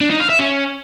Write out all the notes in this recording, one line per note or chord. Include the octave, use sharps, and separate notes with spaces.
D4
D#4
F5
E5
C#4